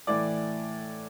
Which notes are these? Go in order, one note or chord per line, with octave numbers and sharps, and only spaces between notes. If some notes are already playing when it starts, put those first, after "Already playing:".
A2 E3 D5 D6